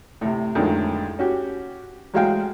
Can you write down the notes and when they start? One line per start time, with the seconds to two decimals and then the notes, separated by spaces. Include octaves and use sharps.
0.21 A2 C3
0.55 F2 A2 D3 D#3 F#3 G#3
1.19 C#4 F#4 G4
2.14 A1 F#3 G#3 F#4 F5 G5